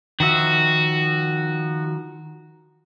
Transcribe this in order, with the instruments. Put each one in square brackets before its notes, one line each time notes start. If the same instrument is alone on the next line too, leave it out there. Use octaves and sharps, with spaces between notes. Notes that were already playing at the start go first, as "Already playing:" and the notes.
[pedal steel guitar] D#3 F3 E5 [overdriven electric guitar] F#4